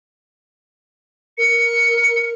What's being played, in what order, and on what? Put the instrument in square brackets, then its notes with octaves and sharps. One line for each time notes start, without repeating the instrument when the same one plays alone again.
[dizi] A#4 [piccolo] C#7